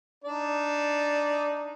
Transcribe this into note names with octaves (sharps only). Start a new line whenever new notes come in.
D4 D#4 D5